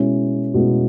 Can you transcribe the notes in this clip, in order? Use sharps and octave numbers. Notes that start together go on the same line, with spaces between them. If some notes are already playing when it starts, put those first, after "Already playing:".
Already playing: B2 G#3 C#4 E4
B2 G#3 C#4 E4